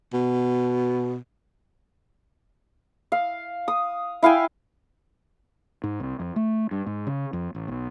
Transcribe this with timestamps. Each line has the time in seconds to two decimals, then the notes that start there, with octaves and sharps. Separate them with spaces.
0.13 B2
3.12 F5
3.68 D#6
4.22 E4 F5 G5 G#5
5.84 G#2
6.00 C2
6.20 F2
6.36 A3
6.71 G2
6.87 G#2
7.07 C#3
7.33 F2
7.55 A1
7.68 B1